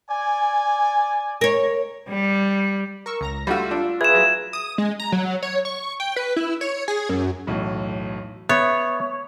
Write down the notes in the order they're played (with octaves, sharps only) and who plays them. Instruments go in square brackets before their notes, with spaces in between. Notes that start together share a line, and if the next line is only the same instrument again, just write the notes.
[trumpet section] D5 G#5
[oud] A#4 C#5
[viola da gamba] G3
[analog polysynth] A#4 C#6 E6
C#2 A#5 A#6
[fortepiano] G3 A3 F#4 [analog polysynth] F4 E6
[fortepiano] D4
[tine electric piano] G#4 B4 E5 [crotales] G#6 E7
[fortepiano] F#3
[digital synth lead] D#6
G#3
A#5
F#3
C#5
C#6
G5
B4
E4
C#5
G#4
F#2
[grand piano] B1 E2 A2
[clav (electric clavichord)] B3 [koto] C#5 [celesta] E5